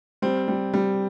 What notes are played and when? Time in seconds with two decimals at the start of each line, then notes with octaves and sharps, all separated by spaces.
0.22 G3 C4
0.48 G3
0.74 G3